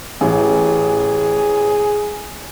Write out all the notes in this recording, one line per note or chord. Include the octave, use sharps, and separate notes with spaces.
A1 G#4